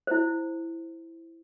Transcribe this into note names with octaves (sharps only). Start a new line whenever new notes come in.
E4 C5